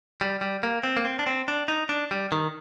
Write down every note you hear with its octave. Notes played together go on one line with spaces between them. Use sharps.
G3
G3
A#3
C4
A#3
C4
D4
C4
D4
D#4
D4
G3
D#3